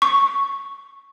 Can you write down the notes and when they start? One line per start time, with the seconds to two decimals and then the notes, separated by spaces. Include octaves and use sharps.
0.02 C#6